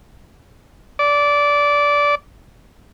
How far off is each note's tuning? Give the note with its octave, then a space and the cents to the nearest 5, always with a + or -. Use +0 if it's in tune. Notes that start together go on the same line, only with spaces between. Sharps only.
D5 -15